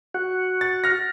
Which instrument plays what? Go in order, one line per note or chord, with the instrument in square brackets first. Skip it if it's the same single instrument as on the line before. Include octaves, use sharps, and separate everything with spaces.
[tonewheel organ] F#4 F#5
[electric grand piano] A6
F6 A#6